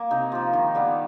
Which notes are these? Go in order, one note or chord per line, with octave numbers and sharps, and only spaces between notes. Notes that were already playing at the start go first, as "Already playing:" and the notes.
Already playing: A#3
C3 D#4
F3 A#3
D#3
G3 B3